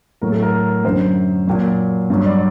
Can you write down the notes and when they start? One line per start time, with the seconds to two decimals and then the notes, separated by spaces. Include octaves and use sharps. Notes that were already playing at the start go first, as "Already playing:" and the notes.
0.21 A2 F#3 A#4
0.32 A4
0.42 A#4
0.84 F#2 D3 F#3 C5
1.48 A#2 F#3
2.10 G2 F#3
2.26 D5